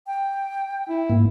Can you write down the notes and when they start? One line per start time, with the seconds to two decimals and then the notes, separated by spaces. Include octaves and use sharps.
0.07 G5
0.89 E4
1.10 G#2 A#3